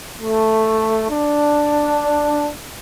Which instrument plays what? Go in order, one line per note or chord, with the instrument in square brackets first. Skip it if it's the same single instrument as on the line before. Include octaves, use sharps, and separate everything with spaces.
[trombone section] A3
D4